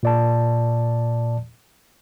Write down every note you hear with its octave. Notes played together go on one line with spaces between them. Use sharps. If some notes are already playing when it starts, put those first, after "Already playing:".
A#2 D5 A5